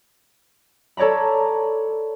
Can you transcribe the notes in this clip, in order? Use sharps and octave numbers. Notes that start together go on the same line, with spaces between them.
A4 C#5 D5 A#5 B5